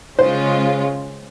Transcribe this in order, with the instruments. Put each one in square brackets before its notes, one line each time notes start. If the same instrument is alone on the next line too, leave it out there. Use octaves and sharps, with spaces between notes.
[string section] C#3 G#3 C#4 F4 [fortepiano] C5